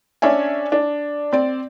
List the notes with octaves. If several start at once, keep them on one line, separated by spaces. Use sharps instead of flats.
C#4 D4 C#5 E5 G#5
D4
C4 D5